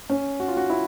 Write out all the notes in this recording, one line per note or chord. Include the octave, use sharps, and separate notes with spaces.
C#4
F#4
F4
F#4
E4